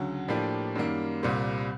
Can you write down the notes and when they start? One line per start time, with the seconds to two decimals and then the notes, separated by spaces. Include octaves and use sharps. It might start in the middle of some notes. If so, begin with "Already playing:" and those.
Already playing: D2 C#3 F#3
0.28 A2 F3 A#3 D4 G4
0.76 F#2 D#3 G3 A#3
1.23 C2 A#2 G3 C4